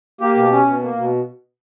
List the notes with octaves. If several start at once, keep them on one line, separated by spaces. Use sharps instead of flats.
A#3 G4
B2
C#4
B2
A#3
B2